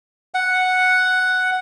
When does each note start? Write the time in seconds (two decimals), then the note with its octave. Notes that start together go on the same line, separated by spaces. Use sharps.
0.34 F#5